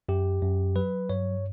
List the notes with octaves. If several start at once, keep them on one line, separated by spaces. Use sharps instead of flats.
F#2 G4
F#2
F#3 B4
G2 C#5